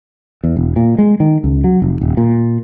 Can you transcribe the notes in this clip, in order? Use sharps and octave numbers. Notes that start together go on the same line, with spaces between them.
E2
E1
A#2
G#3
D#3
C#2
F#3
F1
D#1
A#2